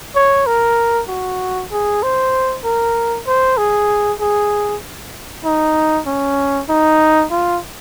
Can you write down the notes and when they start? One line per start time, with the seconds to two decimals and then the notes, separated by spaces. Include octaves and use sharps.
0.16 C#5
0.46 A#4
1.08 F#4
1.71 G#4
2.03 C5
2.64 A#4
3.27 C5
3.57 G#4
4.20 G#4
5.45 D#4
6.06 C#4
6.69 D#4
7.31 F4